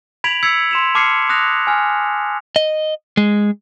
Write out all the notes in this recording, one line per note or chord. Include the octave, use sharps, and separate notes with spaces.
B5 G#6 B6 D7 F7 F#7
E6 G#6 B6 C#7
C6 E7 F7
A5 D6 F6 G#6 C7 C#7
D#6 F#6 A#6 F7
G#5 F6
D#5
G#3